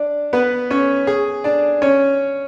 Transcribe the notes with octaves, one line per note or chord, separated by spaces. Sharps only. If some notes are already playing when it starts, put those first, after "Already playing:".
Already playing: D4 D5
B3 B4
C#4 C#5
G#4 G#5
D4 D5
C#4 C#5